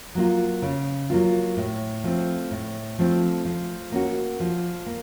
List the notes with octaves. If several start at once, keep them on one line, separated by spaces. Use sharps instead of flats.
F#3 A#3 F4
C#3
F#3 A#3 F4
A2
F3 A3 C4
A2
F3 A3 C4
F3
A#3 C#4 F#4
F3
A#3